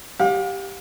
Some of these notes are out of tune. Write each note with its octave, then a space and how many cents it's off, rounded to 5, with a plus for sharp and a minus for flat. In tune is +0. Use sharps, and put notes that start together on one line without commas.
G4 +0 F5 +40